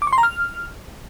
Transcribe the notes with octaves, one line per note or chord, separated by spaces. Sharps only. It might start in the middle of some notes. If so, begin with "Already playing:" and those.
D6
C#6
C6
A#5
F6